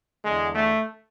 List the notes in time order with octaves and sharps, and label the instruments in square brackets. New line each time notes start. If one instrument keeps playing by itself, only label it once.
[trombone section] E2 D3 G#3
A3